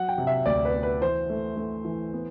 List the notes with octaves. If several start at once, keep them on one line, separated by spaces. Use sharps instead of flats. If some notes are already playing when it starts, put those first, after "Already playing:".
Already playing: F#3 F#5
G5
C3
E5
D2 D5
B4
B3
B4
E3 C5
A3
A3
E3
B3